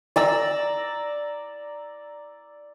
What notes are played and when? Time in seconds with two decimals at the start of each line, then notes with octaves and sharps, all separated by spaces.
0.16 D5 A#5 E6